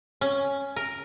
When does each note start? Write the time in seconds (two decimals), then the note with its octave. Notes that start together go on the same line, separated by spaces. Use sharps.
0.21 C#4
0.76 A#4